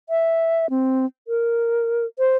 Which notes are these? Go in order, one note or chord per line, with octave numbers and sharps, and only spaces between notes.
E5
C4
A#4
C5